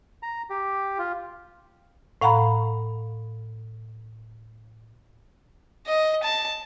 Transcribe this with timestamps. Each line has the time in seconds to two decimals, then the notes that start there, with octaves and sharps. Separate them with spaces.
0.23 A#5
0.50 G4
0.98 F4
2.21 A2 F5 F#5 A#5 B5
5.87 D#5
6.23 A5